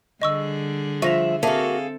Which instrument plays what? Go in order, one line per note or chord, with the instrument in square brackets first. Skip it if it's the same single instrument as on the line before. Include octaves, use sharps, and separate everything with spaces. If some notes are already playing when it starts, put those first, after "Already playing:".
[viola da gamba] D3 G3 G#4 [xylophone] D#5 C#6 E6
[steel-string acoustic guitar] F3 [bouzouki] E5 [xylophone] C#6 A#6 F7
[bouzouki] A#3 F#4 [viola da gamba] C4 A4 [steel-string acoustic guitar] G#4 F5 [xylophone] E5 A5